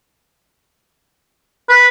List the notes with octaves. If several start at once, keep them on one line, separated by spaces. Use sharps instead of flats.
B4 F#6